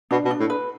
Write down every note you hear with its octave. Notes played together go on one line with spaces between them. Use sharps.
B2 D4
B2
D4
A2
B4